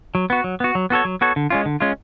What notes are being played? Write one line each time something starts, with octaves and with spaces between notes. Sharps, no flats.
F#3
B3 F#4
F#3
B3 F#4
F#3
B3 F#4 A4 C#5
F#3
B3 F#4 A4 C#5
D3
G#3 C#4 F4
D3
G#3 C#4 F4